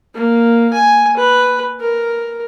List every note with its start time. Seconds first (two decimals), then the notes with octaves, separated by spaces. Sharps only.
0.15 A#3
0.74 G#5
1.17 B4
1.80 A#4